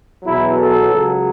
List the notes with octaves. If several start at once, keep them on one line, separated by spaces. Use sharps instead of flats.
E2 B2 F#3 E4
A4
C#2 C#3 F#3